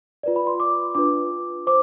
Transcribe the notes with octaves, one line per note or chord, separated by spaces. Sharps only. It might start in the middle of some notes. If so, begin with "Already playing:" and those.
F4 B4 D5
B5
C6
D6
D4 F4 B4 D6
C5 D6